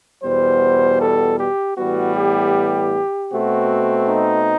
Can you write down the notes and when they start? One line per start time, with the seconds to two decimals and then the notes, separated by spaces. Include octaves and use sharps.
0.23 E2 B2 G3 C5
1.01 A4
1.39 G4
1.77 A2 E3 G3 B3 F#4
2.16 G4
3.32 B2 A3 C4 F#4
4.09 D#4